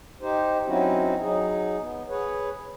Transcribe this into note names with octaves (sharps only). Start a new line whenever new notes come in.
D#4 G4 C5
F#3 C4 C#4 D#4 E4 F#4
F#3 D#4 G#4
B3
G#4 B4 C#5